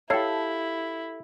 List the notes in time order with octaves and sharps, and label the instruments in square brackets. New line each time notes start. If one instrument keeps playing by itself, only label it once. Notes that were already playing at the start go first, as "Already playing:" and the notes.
[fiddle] E4 [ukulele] G4 F5 [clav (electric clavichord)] A4 [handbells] C#5 C7